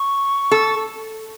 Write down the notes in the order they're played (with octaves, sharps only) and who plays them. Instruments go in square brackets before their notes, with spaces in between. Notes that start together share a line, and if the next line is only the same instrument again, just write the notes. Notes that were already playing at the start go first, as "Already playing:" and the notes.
Already playing: [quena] C#6
[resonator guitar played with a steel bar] A4